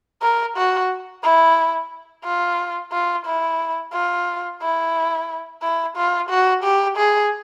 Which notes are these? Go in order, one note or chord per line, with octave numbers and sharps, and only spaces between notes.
A#4
F#4
E4
F4
F4
E4
F4
E4
E4
F4
F#4
G4
G#4